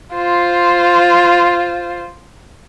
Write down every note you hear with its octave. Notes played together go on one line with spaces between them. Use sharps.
F4 C5